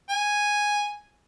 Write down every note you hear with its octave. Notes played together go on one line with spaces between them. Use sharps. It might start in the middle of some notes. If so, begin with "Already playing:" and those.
G#5